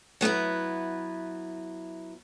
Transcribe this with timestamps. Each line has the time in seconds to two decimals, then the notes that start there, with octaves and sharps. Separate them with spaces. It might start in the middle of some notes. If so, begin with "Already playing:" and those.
0.21 F#3 B3 E4 B4